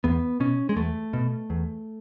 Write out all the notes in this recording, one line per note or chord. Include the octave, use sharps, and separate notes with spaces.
E2 B3
B2 C#4
G#3
E2 A3
B2
E2